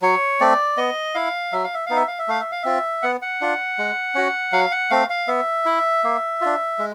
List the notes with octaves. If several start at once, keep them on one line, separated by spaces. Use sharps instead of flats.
F#3 C#5
A3 C4 D5
B3 D#5
E4 F5
F#3 E5
F5
E5
B3 D#4 F5
E5
F5
E5
A3 F5
E5
F5
C4 F4 E5
B3 F#5
F#5
D4 F4
G#3
C#4 F#4
F#3 F5
F#5
A3 C4 F5
F5
B3 E5
E4
A#3
D4 F4
G#3